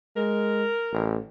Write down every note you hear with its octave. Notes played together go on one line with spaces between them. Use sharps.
G#3 A#4
A1